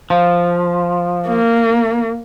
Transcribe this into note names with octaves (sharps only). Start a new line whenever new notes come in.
F3
A#3